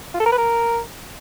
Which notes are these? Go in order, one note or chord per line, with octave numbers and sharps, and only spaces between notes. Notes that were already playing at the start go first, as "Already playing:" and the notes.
F4
A4
A#4
B4
A#4